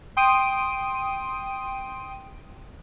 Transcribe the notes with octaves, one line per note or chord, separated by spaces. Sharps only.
G5 C6 D#6 D7 D#7